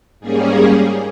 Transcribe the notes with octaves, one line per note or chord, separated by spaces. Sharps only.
G#2 G3 A#3 C#4 G#4